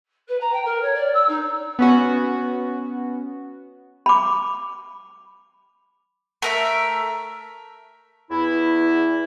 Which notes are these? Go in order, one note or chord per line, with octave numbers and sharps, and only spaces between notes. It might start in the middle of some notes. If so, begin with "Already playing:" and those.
B4
A#5
G5
A#4
C#5
D5
E6
D#4
B3 C#4 F#4
B5 D6
A3 A#4 E5
E2 E4